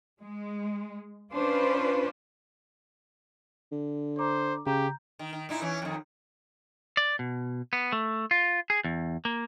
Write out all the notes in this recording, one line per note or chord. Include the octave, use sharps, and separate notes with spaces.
G#3
C#4 D4 F4 B4 C5 D5
D3
C5 A#5 D6
C#3 G4 A#5 G6
D#3
D#3
A#2 D#4 E4
E3 C#4
F2 D#3
D5
B2
B3
A3
F4
G#4
E2
A#3